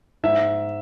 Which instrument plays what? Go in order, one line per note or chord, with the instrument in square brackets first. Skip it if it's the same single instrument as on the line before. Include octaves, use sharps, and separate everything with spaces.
[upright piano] G#2 E5